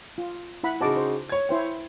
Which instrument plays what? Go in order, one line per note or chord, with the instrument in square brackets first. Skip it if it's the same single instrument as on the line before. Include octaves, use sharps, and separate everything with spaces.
[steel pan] F4
E4 F#5 B5
[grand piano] C#3 D#4 F#4 [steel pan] C5 A5 D6
[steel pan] C5
[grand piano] C#5 G#6
[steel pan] E4 C5 G5